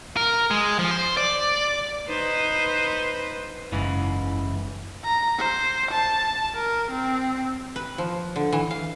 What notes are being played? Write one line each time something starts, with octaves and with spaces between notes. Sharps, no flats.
A#4
G#3
F3
C5
D5
D#4 B4 C5
F#1 G#2 C#3 E3
A#5
C5
A5
A#4
C4
B4
F3
D3
E3
F5